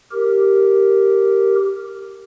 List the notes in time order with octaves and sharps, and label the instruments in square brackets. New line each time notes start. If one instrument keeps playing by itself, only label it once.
[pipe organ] G4 A#4